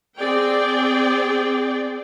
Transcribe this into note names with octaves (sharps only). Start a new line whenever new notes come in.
C4 G#4 D5 G5